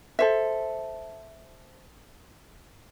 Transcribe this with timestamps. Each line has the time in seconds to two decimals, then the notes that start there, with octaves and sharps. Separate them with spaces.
0.19 A4 C5 E5